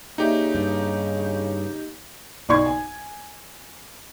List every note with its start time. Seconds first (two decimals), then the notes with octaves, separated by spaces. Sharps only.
0.18 C#3 A#3 D#4 G4 D5 E5
0.55 G2
2.49 B1 D#4 D5 C6 C#6 G#6
2.66 G#5